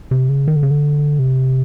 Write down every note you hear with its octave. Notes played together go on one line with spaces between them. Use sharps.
C3
C#3
D#3
D3
C#3
D3
C3